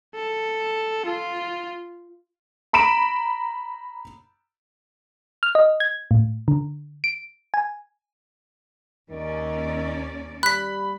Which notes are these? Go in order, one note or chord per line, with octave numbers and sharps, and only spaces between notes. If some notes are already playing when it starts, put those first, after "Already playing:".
A4
F4
A#5 B5 D7 E7
F6
D#5
G#6
A2
D3
D7
G#5
D#2 D#3 C#4 D5
G3 B5 F#6 B6